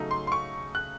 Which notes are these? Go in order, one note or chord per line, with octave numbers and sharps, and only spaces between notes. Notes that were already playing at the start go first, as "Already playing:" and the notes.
Already playing: C#3 F#3 A3 D#4
C6
C6
C#6
F#6